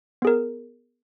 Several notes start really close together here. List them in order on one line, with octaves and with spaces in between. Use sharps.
B3 G#4 A#4